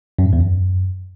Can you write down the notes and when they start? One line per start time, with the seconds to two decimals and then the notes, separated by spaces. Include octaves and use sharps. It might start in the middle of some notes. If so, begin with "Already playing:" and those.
0.19 F#2
0.26 G#2
0.33 E2
0.40 F#2